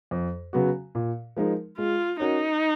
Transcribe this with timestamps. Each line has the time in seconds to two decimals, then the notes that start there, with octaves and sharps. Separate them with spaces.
0.11 F2
0.53 C#3 F#3 B3 F#4
0.95 A#2
1.36 F3 G#3 D#4 A#4
1.78 G#3 F4
2.20 C#4 D#4 F#4 A#4 C#5